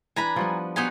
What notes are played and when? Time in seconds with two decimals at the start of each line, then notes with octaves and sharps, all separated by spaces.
0.16 E3 D4 B4 G#5 A#5 B5
0.36 F3 G3 B3
0.76 B3 C4 D#4 F#4 G4 G#5